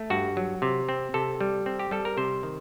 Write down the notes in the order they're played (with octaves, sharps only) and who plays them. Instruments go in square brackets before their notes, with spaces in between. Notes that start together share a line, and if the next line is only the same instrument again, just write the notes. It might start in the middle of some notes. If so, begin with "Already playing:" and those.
Already playing: [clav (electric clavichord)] A3
G2 F#4
F#3
C3
C4
C3 A4
G3
C4
G4
G3 A4
A#4
C3 C5
D#3